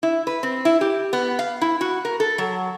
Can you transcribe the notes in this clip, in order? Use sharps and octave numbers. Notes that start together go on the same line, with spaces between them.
E4
B4
C4
E4
G4
B3
F5
E4
F#4
A#4
A4
F#3